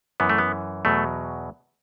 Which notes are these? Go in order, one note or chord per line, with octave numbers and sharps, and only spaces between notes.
F#2 E3 B3
A3
B3
E2 B2 F#3 A3